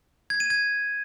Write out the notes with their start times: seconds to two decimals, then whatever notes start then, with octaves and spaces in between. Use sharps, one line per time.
0.30 G#6
0.40 D#7
0.50 G#6